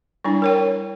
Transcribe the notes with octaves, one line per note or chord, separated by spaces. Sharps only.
G3 D4 E4
A#4 C#5 G5